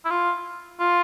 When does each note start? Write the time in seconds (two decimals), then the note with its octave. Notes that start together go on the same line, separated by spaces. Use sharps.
0.05 E4
0.10 F4
0.80 F4